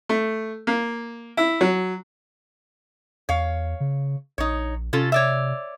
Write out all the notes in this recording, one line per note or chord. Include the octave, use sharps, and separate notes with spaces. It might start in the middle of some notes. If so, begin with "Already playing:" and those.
A3
A#3
E4
F#3
E2 C#5 F5
C#3
A#1 D#4 C#5
C3 C#4 F4 A4
C#5 D5 E5